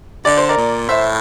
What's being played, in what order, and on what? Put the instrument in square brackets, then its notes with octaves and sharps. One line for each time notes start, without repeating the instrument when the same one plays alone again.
[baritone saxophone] D3 [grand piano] D5
[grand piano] C5
A#4 D5
[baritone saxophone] A#2
[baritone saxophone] A2 [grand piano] C5 E5